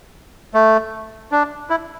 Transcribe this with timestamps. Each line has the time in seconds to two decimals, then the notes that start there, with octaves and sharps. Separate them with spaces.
0.54 A3
1.32 D4
1.70 E4